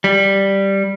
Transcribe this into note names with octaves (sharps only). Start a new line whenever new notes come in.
G3